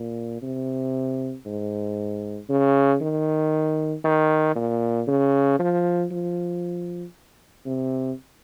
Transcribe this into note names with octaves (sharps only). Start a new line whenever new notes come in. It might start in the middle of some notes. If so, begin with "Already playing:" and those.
Already playing: A#2
C3
G#2
C#3
D#3
D#3
A#2
C#3
F3
F3
C3